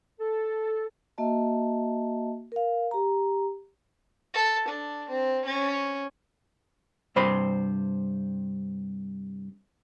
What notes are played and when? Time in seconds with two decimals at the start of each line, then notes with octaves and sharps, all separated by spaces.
0.20 A4
1.18 A#3 F#4 D#5 E5 A5
2.52 A#4 F5
2.91 G4 A#5
4.34 A4
4.68 D4
5.09 C4
5.45 C#4
7.16 G2 C3 C4 C5 B5